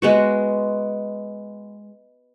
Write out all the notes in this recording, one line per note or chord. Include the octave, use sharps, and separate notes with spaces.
G#3 B3 F#4